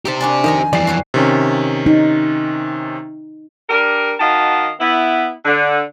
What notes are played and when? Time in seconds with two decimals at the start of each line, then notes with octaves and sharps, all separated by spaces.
0.05 D#4 G4 C5 E5 A5
0.21 D4 F#4 D5 G#5
0.44 F2 D#3 D#5 A#5
0.73 F2 E3 G3 D5 C7
0.87 F#3 G3 F#4
1.14 C3 D#3 C#4
1.86 D#4
3.69 G3 D4 A#4
4.20 D#3 F#4 D#5 F5 A5
4.81 B3 E4
5.45 D3